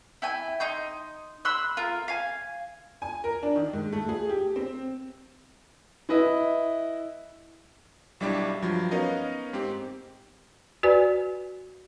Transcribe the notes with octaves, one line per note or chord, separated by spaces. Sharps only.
E4 G5 G#5
D#4 C6 G6
B5 C6 E6 F#6
F4 A#4
F5 G#5
G#5
A#4
D4
D#3
G#2
A3
G#4
G4
C4
E4 B4 D#5 E5
B1 G3 D4 E4 G4 D6
G2 F3 F#3
B3 C#4 D#4 A#4 D#5 F5
G#2 C4 G4
F#4 B4 D5 G#5